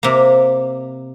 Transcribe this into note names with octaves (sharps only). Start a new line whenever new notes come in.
C3 A#3